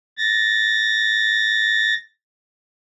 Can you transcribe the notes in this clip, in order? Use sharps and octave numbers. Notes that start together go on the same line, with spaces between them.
A6 A#6